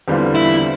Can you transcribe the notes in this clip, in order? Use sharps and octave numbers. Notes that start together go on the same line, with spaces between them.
E2 D3 G3 C4 F4
E4